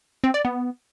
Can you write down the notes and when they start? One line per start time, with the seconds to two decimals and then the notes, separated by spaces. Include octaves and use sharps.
0.24 C4
0.34 D5
0.45 B3